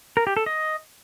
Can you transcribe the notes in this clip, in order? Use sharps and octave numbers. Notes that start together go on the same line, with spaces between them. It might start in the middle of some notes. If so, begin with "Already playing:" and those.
A#4
G4
A4
D#5